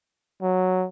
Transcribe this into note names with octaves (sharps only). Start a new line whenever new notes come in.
F#3